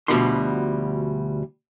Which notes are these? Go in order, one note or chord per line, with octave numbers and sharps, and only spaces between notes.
D2 G2 B2 F3 G3 C6